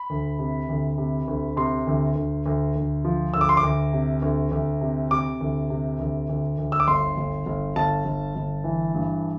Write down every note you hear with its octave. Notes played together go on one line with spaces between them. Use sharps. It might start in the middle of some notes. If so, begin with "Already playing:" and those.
Already playing: B5
D2
C3
D2
C3
D2
C3 C6
D2
D2
D2
D2
F3
D2 E6
D6
C6
D6
D2
C3
D2
D2
C3
C3 D6
D2
C3
D2
D2
D2
E6
D6
G1 C6
G1
G1
G1 A5
G1
G1
E3
G2